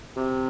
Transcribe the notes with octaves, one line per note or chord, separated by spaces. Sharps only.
C3